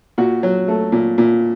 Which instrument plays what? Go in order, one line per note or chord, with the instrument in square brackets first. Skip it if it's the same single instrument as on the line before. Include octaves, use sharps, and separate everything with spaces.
[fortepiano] A#2 F#4
F#3
A3
A#2
A#2